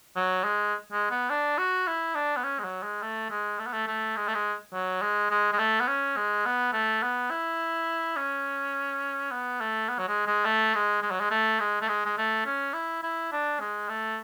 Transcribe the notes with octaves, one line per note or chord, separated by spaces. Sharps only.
F#3
G#3
G#3
B3
D4
F#4
E4
D4
B3
C#4
G#3
F#3
G#3
A3
G#3
A3
B3
A3
A3
G#3
A3
G#3
F#3
G#3
G#3
G#3
A3
B3
C#4
G#3
B3
A3
B3
E4
C#4
B3
A3
B3
F#3
G#3
G#3
A3
G#3
G#3
F#3
G#3
A3
G#3
A3
G#3
G#3
A3
C#4
E4
E4
D4
G#3
A3